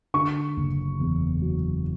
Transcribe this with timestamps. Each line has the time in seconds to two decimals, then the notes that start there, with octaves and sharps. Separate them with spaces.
0.14 D3 C#6
0.56 F#1
1.00 E2
1.42 F#3